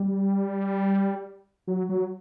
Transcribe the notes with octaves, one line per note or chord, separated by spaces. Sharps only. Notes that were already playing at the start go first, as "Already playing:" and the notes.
Already playing: G3
F#3
F#3